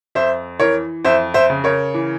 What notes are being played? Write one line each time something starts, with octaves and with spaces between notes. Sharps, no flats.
F2 C5 E5
E3 A#4 C#5
F2 C5 E5
C5 E5
C#3
A#4 C#5
E3